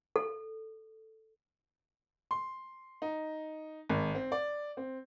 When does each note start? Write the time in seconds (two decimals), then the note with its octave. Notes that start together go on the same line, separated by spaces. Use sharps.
0.16 A4
2.31 C6
3.02 D#4
3.89 G#1
4.15 C4
4.32 D5
4.77 C4